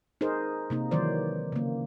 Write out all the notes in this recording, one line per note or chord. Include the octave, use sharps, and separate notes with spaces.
D#4 G#4 A#4 C5
C3 A#3 D#4
D#3 E3 F#3 C5 D5
C#3 A#3